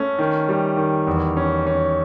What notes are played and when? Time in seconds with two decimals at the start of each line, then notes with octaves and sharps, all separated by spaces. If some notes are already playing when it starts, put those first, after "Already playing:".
Already playing: A3 C#4
0.19 D#3
0.49 G3
0.77 D#3
1.07 E2
1.37 C#4
1.67 C#4